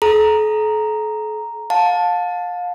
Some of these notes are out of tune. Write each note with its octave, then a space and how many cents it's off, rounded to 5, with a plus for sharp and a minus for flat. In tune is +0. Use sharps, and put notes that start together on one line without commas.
A4 -45 A#5 +0
F5 +30 A5 +0